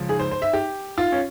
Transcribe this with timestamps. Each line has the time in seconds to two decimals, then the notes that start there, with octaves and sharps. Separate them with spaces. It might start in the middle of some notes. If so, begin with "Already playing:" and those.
Already playing: C#2 C#3 F3
0.09 G#4
0.19 C5
0.31 C5
0.42 E5
0.53 G4
0.98 F4
1.12 C#4